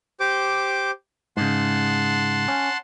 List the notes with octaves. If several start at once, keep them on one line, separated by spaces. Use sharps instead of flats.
G4 C5 D6
G#2 C#3 F#5 A5 C6
C#4